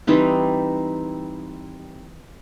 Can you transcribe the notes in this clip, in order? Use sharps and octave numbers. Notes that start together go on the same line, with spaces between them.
E3 G3 C4 D#4